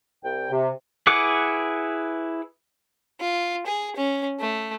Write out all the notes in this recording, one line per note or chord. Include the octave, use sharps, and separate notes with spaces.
C2 G5
C3
E4 G#4 B4 F#5 D6
F4
G#4
C#4
A3